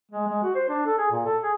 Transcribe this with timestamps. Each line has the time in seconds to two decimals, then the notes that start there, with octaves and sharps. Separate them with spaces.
0.11 G#3
0.27 G#3
0.43 F#4
0.55 C5
0.69 D4
0.86 A4
0.98 G#4
1.11 A#2
1.25 A4
1.43 G#4